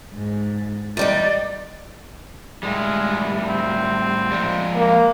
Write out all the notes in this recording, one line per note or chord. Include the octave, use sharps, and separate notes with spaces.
G#2
E2 G3 D#4 D5
A2 G3 G#3
C4
F3 G#3 D5
A#3